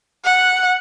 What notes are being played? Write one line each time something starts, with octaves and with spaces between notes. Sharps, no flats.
F#5